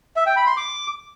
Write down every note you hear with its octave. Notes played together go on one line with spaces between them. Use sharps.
E5
G5
B5
C6
D6